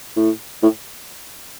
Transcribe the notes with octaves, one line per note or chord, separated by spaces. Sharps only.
A2
A2